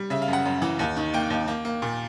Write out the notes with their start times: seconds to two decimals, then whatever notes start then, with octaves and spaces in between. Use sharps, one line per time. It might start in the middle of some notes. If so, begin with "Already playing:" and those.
Already playing: G3
0.10 C#3 E5
0.22 F5
0.28 F#2
0.33 F#5
0.45 F#2
0.62 E3
0.79 D#2
0.97 D#3
1.14 A#3 G5
1.30 D#2
1.48 A#3
1.65 A#3
1.82 A#2